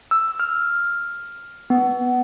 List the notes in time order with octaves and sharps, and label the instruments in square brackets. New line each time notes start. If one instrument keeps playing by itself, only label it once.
[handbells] E6
F6
B3